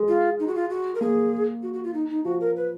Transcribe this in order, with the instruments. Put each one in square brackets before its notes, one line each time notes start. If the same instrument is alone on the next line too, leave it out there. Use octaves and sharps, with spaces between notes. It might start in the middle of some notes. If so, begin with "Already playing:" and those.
Already playing: [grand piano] G#3
[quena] F4
D#4
F#4
F4
F#4
A#4
[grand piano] A#3 [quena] G#4
[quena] F#4
F#4
F4
D#4
D#4
[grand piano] F3 [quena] F#4
[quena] A#4
B4